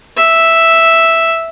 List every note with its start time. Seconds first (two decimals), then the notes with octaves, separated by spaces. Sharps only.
0.17 E5